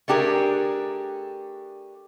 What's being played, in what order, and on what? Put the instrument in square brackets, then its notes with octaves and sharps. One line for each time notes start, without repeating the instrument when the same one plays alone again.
[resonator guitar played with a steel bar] A3 D4 G4 G#4 A#4